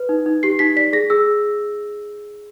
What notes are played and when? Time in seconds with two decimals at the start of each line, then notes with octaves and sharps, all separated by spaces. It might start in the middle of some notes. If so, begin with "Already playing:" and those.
Already playing: B4
0.09 D#4
0.26 D#4
0.43 G4 C7
0.59 D#4 B6
0.76 D5 B6
0.93 G#4 A#6
1.10 G#4 E6